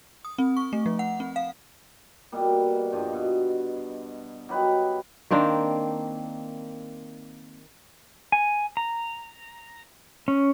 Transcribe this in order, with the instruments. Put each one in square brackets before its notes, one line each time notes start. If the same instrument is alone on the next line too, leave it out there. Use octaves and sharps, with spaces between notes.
[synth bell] D#6
C4
C#6
A3
F3
F#5
C4
F5
[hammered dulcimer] B2 G3 A#3
G2 F3 D#5
B2
F#3 D#4 G4 B4
[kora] D#3 A#3 C4 D4
[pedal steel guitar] G#5
A#5
C#4